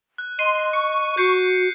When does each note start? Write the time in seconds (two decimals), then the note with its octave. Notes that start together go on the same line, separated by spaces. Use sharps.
0.18 F#6
0.39 D#5 C6 D#7
0.73 C#6
1.17 F#4 G6 C7 C#7